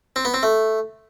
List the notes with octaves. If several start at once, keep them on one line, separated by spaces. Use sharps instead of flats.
C4
B3
C4
A3